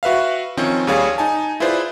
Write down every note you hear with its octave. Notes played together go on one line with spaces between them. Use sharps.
F#4 B4 E5 F5
D#3 F3 C4 C#4
D#2 G3 G#4 C#5 F5
D#4 G#5 A5
E4 F4 G#4 B4 C5 D5